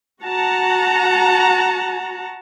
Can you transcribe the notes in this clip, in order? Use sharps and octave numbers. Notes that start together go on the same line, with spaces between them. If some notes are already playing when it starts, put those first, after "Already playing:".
F#4 F#5 A5 A#5